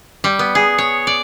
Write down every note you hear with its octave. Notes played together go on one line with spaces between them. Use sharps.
G3
B3
G#4
C#5
D5